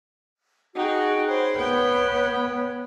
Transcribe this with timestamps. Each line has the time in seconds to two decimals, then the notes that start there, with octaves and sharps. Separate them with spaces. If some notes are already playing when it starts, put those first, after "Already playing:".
0.75 D#4 F#4 G#4 G5
1.28 C5 C#5 B5
1.58 B3 G5